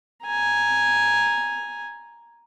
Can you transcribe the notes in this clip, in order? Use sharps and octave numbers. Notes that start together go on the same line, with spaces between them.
G#5 A#5